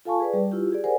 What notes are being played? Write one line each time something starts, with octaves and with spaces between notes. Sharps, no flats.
F4 A4 F5 G#5 A5 C#6
G#4 B4 D5
G3
E4 F4 G4
G4 G#4 D5
A#4 C5 D5 F#5 G#5